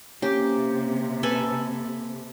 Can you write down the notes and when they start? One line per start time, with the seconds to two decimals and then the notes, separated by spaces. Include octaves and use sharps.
0.22 C3 A#3 C#4 G4 D6
1.23 A4 B4 G#5